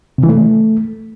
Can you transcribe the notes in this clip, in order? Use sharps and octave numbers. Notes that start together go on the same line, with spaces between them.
C3
E3
A3